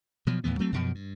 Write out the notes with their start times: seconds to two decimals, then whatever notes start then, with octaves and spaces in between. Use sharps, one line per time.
0.27 B2 F3 F#3
0.44 D#2 A2 E3 B3
0.59 F#3 A3 C4
0.72 F#2 B2 F3
0.95 G2